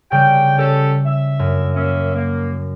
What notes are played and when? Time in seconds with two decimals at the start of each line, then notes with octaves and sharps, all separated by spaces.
0.12 C#3 G3 G5
0.58 C#4 G4 A4
1.05 E5
1.39 F#2
1.74 A#3 C#4 E5
2.15 A#3